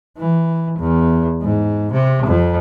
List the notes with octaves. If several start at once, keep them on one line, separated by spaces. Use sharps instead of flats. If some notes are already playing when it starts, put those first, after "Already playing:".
E3
E2
G#2
C3
F2